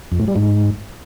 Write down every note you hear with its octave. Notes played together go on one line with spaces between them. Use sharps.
F2
A2
G3
G#2